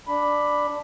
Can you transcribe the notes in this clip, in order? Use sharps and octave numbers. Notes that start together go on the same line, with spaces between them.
D4 B5